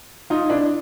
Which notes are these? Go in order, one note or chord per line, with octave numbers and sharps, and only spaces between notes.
D#4 F4
D4 E4